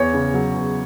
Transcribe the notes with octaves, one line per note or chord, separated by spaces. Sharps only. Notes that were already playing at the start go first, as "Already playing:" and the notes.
Already playing: E2 C#5
C#3
F#3
E2